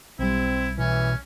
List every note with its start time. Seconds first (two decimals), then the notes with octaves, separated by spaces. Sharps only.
0.19 B1 G3 C4 E4
0.79 B2 E3 C#4